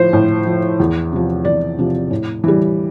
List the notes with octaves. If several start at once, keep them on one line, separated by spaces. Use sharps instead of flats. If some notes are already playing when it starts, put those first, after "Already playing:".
Already playing: A2 F3 C5
A2
F3
E2
C3 F3
E2 D5
C3 F3
A2
E3 G3